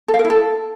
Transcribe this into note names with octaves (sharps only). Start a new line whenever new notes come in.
A4
F5
A#4
E4
A4